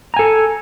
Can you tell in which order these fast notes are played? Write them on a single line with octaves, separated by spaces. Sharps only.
A#5 G#5 A4